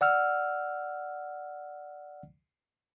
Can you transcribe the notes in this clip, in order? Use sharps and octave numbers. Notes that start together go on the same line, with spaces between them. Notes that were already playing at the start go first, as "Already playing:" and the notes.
D5 F#5 E6 F6